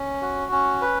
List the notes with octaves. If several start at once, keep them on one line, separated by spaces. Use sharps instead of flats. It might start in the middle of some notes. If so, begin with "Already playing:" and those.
Already playing: C#4
F#4
C#4
B4